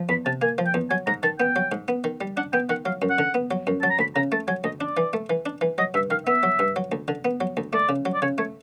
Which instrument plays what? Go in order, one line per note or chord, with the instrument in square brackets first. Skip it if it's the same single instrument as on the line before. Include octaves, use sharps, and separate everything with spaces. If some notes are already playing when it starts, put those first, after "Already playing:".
Already playing: [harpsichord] F3
[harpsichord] E2 [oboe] B5
[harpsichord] C3 [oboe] A5
[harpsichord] A#3 [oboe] G#5
[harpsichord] F3
[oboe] G5
[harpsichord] E2
[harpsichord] F#3 [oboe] G#5
[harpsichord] G#2 [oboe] A#5
[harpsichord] D#3 [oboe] A5
[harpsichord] B3 [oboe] G5
[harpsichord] F#3
G#2
B3
D#3
G3
[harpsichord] D4 [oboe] F#5
[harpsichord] B3 [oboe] G5
[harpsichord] D#3 [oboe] F#5
[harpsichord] F#3 [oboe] F5
[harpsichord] F#2
[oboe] F#5
[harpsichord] D3
B3
F#3
F#2
[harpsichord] F#3 [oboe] A5
[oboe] A#5
[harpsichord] D2 [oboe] B5
[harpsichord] C#3 [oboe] A#5
[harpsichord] A3 [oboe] A5
[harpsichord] F#3 [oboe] G#5
[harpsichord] D2 [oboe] D#5
[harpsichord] D4 [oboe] D5
[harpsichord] E3
A3
E3
D4
E3
[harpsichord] F#3 [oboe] D#5
[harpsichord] G2 [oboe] E5
[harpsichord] D#3 [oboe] F5
[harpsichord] B3 [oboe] E5
[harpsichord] F#3
G2
F#3
D2
D3
B3
F#3
D2
[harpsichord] A3 [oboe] D5
[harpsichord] C#3
F#3
[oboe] D5
[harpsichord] C#3 [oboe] C#5
[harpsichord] A3 [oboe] C#5